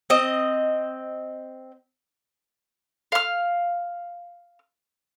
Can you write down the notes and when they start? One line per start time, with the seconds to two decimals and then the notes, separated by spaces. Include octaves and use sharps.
0.10 C4 D#5
3.12 F5 F6